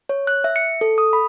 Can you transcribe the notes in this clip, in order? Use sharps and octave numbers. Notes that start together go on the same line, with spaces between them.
C#5
F#6
E5
C#7
A4
D#6
B5